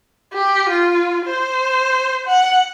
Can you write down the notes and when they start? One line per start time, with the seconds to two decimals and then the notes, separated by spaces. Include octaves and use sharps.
0.34 G4
0.69 F4
1.26 C5
2.27 F#5